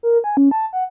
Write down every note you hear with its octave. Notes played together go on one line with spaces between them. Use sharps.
A#4
G#5
C#4
A5
F#5